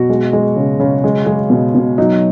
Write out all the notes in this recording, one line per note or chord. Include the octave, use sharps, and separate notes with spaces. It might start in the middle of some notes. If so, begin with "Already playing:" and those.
Already playing: B2 F#4
G#3
G#3
C#3
C#3
G#3
G#3
B2
B2
F#3 D#4